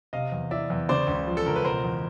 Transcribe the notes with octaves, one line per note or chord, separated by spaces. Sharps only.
C3 D#5 F5
E2
E3 D5 E5
E2
C#3 C5 D5
C#2
F3
A4
C#2 A#4
B4
B2 A#4 C5
E2